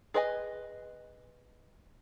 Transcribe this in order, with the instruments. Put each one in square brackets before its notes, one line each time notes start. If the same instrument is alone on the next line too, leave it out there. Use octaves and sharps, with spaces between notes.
[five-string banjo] G#4 B4 D#5 G#5